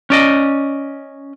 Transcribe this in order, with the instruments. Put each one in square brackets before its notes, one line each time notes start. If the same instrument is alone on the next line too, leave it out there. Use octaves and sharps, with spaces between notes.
[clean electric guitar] C#4 D5 D#5